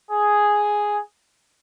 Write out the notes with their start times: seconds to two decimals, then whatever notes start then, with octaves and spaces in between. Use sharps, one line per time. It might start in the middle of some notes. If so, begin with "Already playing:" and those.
0.11 G#4